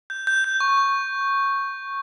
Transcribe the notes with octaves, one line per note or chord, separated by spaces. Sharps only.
G6
G6
G6
C#6
C#6